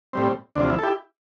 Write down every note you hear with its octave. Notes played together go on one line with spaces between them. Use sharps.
A2 G3 C4
D2 C3 F3 D4
E4
A4
E4 G4